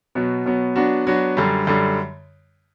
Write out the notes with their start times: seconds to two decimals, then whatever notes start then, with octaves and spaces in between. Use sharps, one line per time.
0.15 B2 F#3 B3
0.46 B2 F#3 B3
0.76 F#3 B3 D4 F#4
1.07 F#3 B3 D4 F#4
1.37 F#2 D3 G3
1.67 F#2 D3 G3